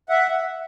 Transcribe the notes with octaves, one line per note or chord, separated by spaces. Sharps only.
E5 F#5